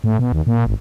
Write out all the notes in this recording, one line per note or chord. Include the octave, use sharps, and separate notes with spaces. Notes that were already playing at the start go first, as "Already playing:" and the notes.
A2
B2
D#2
A#2
G#1